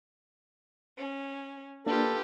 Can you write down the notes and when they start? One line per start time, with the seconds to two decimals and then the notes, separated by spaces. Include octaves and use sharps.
0.98 C#4
1.86 A#3 D4 F4 G4 A4 B4